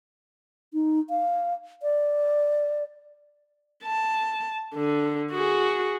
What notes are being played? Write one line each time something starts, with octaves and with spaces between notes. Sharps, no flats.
D#4
F5
D5
A5
D3
F#4 G#4